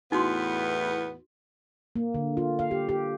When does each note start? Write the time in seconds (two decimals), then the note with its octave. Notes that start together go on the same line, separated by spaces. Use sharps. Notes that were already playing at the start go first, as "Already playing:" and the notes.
0.12 E2 A2 B3 D#4 F#4 C6
1.96 A#3
2.14 D3
2.37 F4
2.59 F5
2.71 G4
2.89 G4